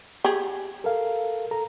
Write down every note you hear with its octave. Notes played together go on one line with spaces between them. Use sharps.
G4 G#4
A4 A#4 F5
A4 A#5